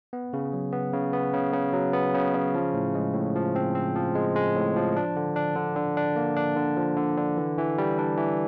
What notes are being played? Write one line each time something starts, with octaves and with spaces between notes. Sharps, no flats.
B3
C#3
F#3
B3
C#3
B3
C#3
C#3
F#3
B3
C#3
C#3
F3
A2
G#3
A2
F3
C4
C4
F3
G#3
G#3
A2
F3
D4
D3
D4
D3
D3
D4
A#3
D4
D3
F3
D3
D3
E3
E3
G3
D4
E3